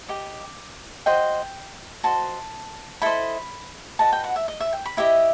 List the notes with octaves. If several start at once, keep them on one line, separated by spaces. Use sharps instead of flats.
G4 D#5 G5
F#4 C5 D#5 G5
F#4 C5 D#5 A5
E4 A4 C5 D#5 B5
F#4 B4 D#5 A5
G5
F#5
E5
D#5
E5
G5
B5
E4 G4 D#5 E5